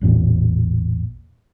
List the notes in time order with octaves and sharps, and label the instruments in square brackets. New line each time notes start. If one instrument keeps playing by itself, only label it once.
[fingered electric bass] A1 E2 A#2